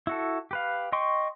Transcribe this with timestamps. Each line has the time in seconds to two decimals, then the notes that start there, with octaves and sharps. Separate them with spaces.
0.07 E4 F#4 A4
0.51 G4 B4 F5
0.92 D#5 G5 C6 C#6